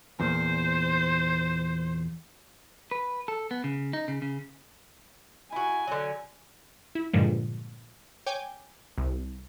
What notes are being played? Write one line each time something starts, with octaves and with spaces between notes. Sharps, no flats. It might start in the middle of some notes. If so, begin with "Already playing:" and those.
E2 A#2 C5
B4
A4
B3
C#3
D#4
C#3
C#3
E4 F#4 G#5
D3 F#3
E4
G2 A#2 D3 F3 G#3
C#5 G5 G#5 D6 G6 G#6
C2